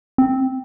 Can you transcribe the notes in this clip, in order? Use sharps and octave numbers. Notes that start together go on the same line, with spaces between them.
C4